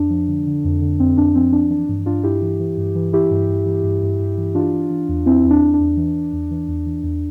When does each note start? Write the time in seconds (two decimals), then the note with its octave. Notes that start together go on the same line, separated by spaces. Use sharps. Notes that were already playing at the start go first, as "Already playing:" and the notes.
Already playing: F2 D4
0.10 F3
0.28 D3
0.46 D3
0.64 F2
0.81 D3
1.00 F2 C4
1.17 F2 D4
1.35 F3 C4
1.53 F3 D4
1.70 E3 D4
1.88 G2
2.06 G2 D4 F4
2.23 G2 E4 G4
2.42 E3
2.60 E3
2.77 G2
2.95 E3
3.12 E3 E4 G4
3.31 G2
3.49 G2
3.66 E3
3.83 G2
4.02 G2
4.20 G2
4.38 E3
4.55 E3 D4 F4
4.73 E3
4.90 E3
5.09 E2
5.26 E2 C4 E4
5.44 E2
5.50 D4
5.62 E2
5.74 D4
5.80 E2
5.97 E3
6.15 E3
6.33 E2
6.51 E3
6.68 E2
6.86 E3
7.03 E2